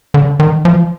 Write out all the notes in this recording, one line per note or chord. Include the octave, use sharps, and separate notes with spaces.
D3
D#3
F3